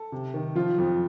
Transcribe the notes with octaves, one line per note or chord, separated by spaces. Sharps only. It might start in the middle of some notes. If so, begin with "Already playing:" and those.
Already playing: A4
C3
D#3
F3 F4
F2